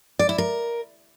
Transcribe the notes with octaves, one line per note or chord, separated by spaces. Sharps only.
D5
E4
A#4